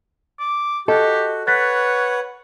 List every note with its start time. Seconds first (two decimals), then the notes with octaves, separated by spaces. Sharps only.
0.39 D6
0.88 F#4 G4 A4 D#5
1.47 B4 C#5 F#5 F#6 A6 B6